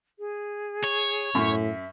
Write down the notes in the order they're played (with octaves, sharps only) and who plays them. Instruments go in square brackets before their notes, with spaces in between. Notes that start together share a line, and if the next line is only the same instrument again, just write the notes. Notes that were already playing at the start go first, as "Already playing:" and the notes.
[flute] G#4
[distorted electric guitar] C#5
[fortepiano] F#2 [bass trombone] A2 [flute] E5